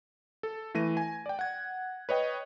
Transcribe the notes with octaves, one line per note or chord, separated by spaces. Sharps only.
A4
E3 A3 A#6 D#7
G#5
D5 G5
F#5 G#6
B4 C#5 D#5 G5